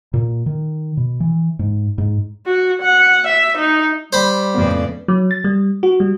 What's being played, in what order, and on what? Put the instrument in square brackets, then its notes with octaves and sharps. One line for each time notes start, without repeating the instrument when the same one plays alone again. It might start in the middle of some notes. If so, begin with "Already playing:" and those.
[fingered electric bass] A#2
D#3
B2
E3
G#2
G#2
[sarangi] F#4
F#5
E5
D#4
[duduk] G3 [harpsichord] C5 B5
[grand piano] F2 B3 [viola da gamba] A2 C#3 D5
[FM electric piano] F#3
A6
G3
F#4
G3